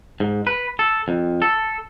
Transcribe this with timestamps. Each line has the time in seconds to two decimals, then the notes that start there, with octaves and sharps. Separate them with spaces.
0.20 G#2
0.47 B4
0.79 A4
1.08 F2
1.42 A4